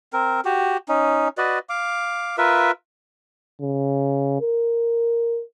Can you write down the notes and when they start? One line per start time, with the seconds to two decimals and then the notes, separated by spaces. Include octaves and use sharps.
0.13 C4 A#4
0.45 F#4 G4
0.89 C#4 D#4
1.38 F#4 B4 D5 D#5
1.69 F5 D6
2.38 F4 A#4 B4 E5
3.61 C#3
4.41 A#4